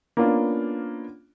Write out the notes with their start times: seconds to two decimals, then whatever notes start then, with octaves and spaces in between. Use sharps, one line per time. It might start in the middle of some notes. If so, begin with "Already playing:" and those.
0.17 A#3 B3 C#4 D4 F4